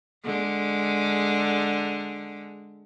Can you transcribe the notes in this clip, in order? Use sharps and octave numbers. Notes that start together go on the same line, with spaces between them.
D3 G#3